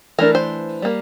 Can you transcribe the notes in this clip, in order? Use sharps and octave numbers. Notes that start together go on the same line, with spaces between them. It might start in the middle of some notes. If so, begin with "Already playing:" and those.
E3 A3 D4 A#4
C5
G3 A#3